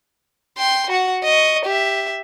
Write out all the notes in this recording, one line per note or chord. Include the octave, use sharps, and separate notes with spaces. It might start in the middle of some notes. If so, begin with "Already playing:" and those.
G5 C6
F#4 F#5
D#5 C#6
G4 E5